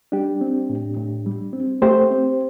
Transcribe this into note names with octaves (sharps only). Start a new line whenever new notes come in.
G3 D4 G4
C4
A2
A2
G3
C4
A3 G4 C5
C4